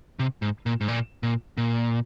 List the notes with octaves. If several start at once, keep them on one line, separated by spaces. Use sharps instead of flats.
C3
G#2
A#2
G#2
A#2
A#2
A#2